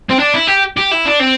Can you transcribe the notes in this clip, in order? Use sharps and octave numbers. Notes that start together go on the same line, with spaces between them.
C4
D4
E4
G4
G4
E4
D4
C4